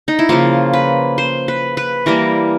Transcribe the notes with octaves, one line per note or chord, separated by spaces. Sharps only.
D#4
E4
C#3 F3 A#3 F4
B4
C5
B4
B4
E3 G3 A#3 A#4